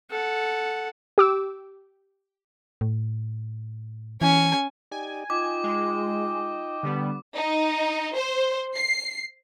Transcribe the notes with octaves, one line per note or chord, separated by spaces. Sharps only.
A4 F#5
G4 D6 E6
A2
E3 C#4 G#5
D#4 G4 D5 G#5
D#4 F4 D#5 G5 D6
G#3
D3 G3 B3
D#4
C5
C7